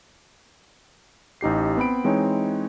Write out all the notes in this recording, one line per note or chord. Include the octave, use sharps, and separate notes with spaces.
A1 D#4 G4 C7
B3 C4 B5 D7
E3 G#3 C4 D#4 C#5